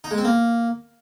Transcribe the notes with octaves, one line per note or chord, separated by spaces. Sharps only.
D#4
G#3
C4
A#3